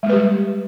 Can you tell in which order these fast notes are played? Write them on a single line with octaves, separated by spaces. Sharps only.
G#3 A#3 B4 G4 G3